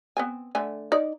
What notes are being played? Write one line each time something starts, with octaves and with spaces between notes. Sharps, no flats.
B3 C4 G#5
D3 A3 G#5
D#4 D5